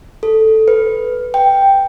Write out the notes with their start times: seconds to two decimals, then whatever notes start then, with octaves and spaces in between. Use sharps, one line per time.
0.23 A4
0.68 B4
1.34 G5